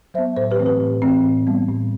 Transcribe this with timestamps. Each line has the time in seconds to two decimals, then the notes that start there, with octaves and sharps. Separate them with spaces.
0.14 F#3 B3 C5 E5
0.36 A2 A4 C5
0.51 G4 B4
0.58 E3 A3 C4
0.66 G4 B4
0.81 A2
1.02 E3 A3 C4
1.24 A2
1.47 G3 B3
1.68 A2